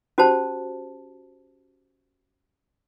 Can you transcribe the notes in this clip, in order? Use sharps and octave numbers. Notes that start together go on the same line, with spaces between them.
C#4 F#4 G4 C5 A5